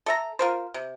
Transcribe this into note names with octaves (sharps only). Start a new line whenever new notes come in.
A4 E5 A#5
F4 A#4 C5
C3